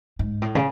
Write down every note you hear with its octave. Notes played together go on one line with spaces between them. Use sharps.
G#2
A2
C#3